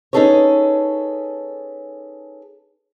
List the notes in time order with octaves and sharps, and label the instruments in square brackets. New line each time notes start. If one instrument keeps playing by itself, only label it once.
[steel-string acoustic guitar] C#4 D#4 G#4 A4 B4 C#5